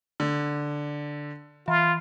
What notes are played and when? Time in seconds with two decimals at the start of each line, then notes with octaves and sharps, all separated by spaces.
0.20 D3
1.68 E3 F4